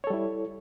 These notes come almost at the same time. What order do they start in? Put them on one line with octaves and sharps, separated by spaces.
C#5 A4 G3 E4